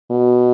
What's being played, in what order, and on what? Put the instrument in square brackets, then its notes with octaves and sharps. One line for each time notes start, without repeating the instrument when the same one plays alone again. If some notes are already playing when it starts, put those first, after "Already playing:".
[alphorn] B2